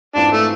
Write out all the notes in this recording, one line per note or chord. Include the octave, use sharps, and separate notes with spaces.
G#2 E3 G#3 C4 D4 F4
A3